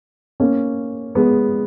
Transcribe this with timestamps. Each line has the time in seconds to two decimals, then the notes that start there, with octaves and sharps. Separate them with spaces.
0.40 A#3 C#4
1.15 G#3 B3